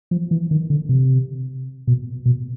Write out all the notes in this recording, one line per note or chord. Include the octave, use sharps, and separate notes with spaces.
F3
E3
D#3
D3
C3
B2
B2